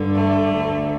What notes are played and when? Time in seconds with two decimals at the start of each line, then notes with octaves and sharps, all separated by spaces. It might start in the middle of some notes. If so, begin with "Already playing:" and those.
Already playing: G2 D3
0.15 A3
0.53 D2 D3